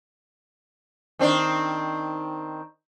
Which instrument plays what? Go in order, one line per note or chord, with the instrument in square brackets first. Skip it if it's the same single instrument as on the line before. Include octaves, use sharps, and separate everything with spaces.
[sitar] D#3 C4 D4